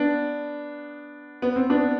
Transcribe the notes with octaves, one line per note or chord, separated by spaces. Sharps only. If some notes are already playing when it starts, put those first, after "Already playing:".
Already playing: B3 D4
B3
C4
B3 D4